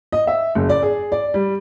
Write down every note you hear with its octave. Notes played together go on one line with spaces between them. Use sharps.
D#5
E5
F#1
D5
G#4
D5
G3